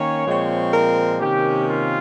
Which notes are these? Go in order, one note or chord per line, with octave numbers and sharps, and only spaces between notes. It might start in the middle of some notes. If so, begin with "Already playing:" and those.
Already playing: D#3 A#3 C#4 C#5
A#2 F3 G#3 C4
A#4
C3 D#3 A#3 C#4 G4
F4